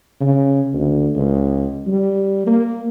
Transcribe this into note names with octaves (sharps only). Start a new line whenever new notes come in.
C#3
D2
C#2
G3
A#3